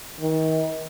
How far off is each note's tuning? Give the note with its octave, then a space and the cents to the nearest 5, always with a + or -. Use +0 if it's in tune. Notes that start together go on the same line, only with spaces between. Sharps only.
D#3 +35